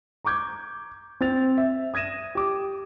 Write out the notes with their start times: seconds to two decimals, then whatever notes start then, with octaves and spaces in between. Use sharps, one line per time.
0.24 A#5 C#6 D6 G6 G#6
1.21 C4 G5 A6 F7
1.58 E5
1.94 D#6 G#6 A#6 D#7 E7
2.35 G4 D6 D#6